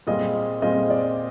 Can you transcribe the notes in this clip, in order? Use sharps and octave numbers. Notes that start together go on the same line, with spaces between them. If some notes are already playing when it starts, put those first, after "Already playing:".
A#2 G3 C4 F4 G#4 D#5
A#2 G3 C4 F4 G#4 D#5
D5